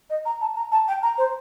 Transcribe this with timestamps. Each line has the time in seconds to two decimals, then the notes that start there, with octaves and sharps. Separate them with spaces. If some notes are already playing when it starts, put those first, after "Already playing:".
0.09 D#5
0.25 A#5
0.41 A5
0.55 A#5
0.71 A5
0.87 G5
1.02 A#5
1.17 C5